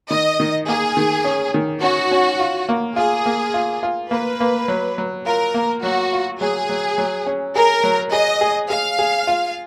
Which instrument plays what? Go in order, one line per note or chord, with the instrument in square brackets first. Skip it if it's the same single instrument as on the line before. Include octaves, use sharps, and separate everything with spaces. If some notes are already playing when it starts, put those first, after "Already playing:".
[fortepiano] D#3 [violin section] D#5
[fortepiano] D#3
[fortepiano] A#3 [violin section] G#4
[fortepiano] D#3
C#4
D#3
[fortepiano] C#4 [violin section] F#4
[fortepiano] C#4
F4
A#3
[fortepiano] F4 [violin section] G#4
[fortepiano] A#3
F4
F4
[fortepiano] A#3 [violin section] B4
[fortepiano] A#3
F#3
F#3
[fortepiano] F4 [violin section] A#4
[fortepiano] A#3
[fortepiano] F#3 [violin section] F#4
[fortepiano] F4
[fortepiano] F#3 [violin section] G#4
[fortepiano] F#3
F#3
C#4
[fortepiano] G#4 [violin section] A#4
[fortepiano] F#3
[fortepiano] G#4 [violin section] D#5
[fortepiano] G#4
[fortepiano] G#4 [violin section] F5
[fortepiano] G#4
F4